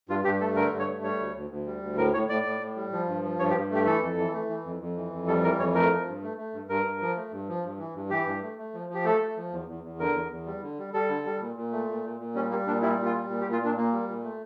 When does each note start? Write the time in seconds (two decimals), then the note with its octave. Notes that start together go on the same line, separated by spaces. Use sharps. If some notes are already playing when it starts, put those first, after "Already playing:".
0.09 G2 F4
0.24 G2 G4
0.40 A3 A4
0.56 D3 A#4
0.72 G2
0.79 C#5
0.88 A3
1.03 G3 C#5
1.19 D2
1.35 D2
1.50 D2
1.66 G3
1.82 D2
1.97 A2 A#4
2.14 A2 C#5
2.29 A2 D5
2.45 A2
2.61 A2
2.76 G3
2.92 F3
3.08 G2
3.24 F3
3.39 G2 C#5
3.50 G4
3.55 G2
3.70 A3 G4
3.86 E3 A4
4.02 F2
4.18 E3
4.33 A3
4.49 E3
4.65 F2
4.81 F2
4.97 E3
5.13 F2
5.27 G3 A4
5.43 E3 A#4
5.59 F2 C#5
5.74 A3 A#4
5.91 F3
6.07 G2
6.22 A3
6.37 A3
6.53 G2
6.69 G2 A#4
6.85 G2
7.01 F3
7.16 A3
7.32 G2
7.48 F3
7.64 G2
7.79 E3
7.95 G2
8.10 E3 G4
8.26 G2
8.42 A3
8.58 A3
8.74 F3
8.89 F3 G4
9.05 A3 A4
9.21 A3
9.37 F3
9.52 E2
9.68 E2
9.84 E2
9.99 D3 A#4
10.15 E2
10.31 E2
10.46 G3
10.62 D3
10.78 G3
10.93 G3 A4
11.09 D3
11.25 G3
11.40 A#2
11.56 A#2
11.72 A3
11.88 A#2
12.04 A#2
12.20 A#2
12.35 G3 C#4
12.50 G3 A#3
12.67 A#2 D4
12.82 G3 E4
12.98 A#2
13.05 F4
13.14 G3
13.29 A#2
13.41 G4
13.45 A#2
13.52 F4
13.61 A#2 D4
13.77 A#2 A#3
13.92 G3
14.08 A#2
14.24 A3